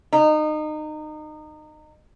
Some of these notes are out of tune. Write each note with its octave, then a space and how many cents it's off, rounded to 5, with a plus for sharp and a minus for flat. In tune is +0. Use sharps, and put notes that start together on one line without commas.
D#4 -25